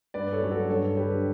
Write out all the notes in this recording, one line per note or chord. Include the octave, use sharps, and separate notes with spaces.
G2 B4 D5
A4 C#5
F#3 C#4
F#4 A4
G2 A4 C#5
D3 F#3 G4 B4